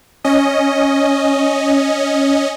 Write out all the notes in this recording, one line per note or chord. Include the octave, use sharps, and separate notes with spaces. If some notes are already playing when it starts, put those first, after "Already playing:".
C#4 D#5